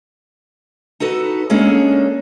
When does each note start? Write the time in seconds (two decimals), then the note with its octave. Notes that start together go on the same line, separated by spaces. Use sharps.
1.00 D#4 F#4 A4 B4
1.50 G#3 A#3 C#4 D4 G#4 A4